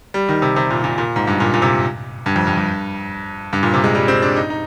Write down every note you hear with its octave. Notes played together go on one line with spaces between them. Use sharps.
G3
D#3
C3
C3
A#2
A#2
A#2
G#2
G2
A#2
A#2
C3
G2
F2
G2
G2
G2
A#2
C3
G#3
G3
C4
D4
D#4
D#4